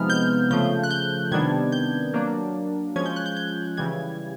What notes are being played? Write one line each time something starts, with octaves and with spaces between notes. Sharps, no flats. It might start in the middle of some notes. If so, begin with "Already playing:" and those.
Already playing: C3 F3 G#3 B3 D#4 F6
G6
C#3 F3 A3 G6
F#6
G6
C3 D#3 G3 B3 D4 G#6
G6
F#3 A#3 D4
F3 G#3 C#4 G#6
G6
F#6
G6
G6
C#3 E3 G3 G#6